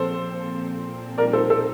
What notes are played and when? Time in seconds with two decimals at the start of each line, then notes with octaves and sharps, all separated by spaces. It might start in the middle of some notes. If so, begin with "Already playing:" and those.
Already playing: A#2 F3 C4 A4 C5
1.18 A#2 G3 C4 D#4 A#4 D5
1.33 A4 C5
1.50 A4 C5